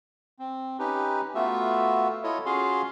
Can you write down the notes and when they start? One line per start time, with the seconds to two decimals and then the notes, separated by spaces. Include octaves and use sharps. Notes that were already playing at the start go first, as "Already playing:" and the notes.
0.39 C4
0.79 C#4 D#4 G4 B4
1.35 A3 B3 F4 F#4 E5
2.23 E4 F4 A4 C#5 D#5
2.45 C#4 F4 F#4 G#4 F5 C6